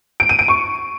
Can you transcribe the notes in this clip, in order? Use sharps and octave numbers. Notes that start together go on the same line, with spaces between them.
D7
D#7
D7
C#6